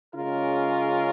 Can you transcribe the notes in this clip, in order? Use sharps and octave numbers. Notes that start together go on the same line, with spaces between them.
C#3 G#3 C#4 F4 A#4